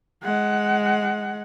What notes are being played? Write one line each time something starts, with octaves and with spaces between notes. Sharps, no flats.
G#3 F#5